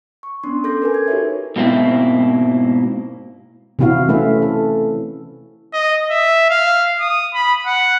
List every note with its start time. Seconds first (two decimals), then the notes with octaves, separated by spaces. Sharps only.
0.23 C#6
0.44 B3 C#4 D4 C6
0.64 A4 D6 G6 A#6
0.82 A#4 B4 G#5
0.94 G#6
1.08 D#4 F#4 G4 A4 C#5 E5
1.56 G#2 B2 A#3 C4 E4
3.79 C3 E3 C4 E4 F#4 F5
4.09 A3 C#4 E4 B4 E5
4.42 A4
5.73 D#5
6.10 E5
6.50 F5
7.00 D#6
7.34 B5
7.66 F#5